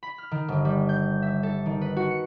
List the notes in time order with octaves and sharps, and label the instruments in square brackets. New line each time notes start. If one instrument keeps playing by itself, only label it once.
[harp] B5
F6
D#3
G1
G3
G6
E5
A4
D#3
B4
F#4
C#7